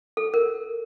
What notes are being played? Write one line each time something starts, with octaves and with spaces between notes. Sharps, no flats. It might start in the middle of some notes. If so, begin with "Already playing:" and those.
A4
A#4